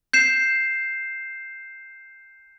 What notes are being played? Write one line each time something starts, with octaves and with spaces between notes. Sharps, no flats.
G6 C7 E7